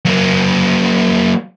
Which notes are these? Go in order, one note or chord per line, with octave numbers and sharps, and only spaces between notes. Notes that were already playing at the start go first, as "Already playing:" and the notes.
F#3 A#3